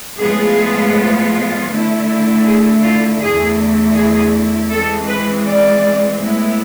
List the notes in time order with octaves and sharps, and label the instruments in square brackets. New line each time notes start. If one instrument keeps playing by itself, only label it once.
[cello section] A2 F3 G#3 B3 F4 G#4
D3 A3 E4
G#4
F4
E2 D3 A3 E4 G#4
G#4
E3 G#3 C4 A4
B4
D5
A2 G#3 B3 E4